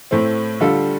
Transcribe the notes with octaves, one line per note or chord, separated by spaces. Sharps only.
A2 A3 C4
D3 G3 F4 A4